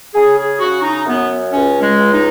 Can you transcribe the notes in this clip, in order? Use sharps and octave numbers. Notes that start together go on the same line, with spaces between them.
C#3 G#4
G#4
C#3 F#4
D#4
F#2 B3
C#2 C#4
G#3
C#2
D#4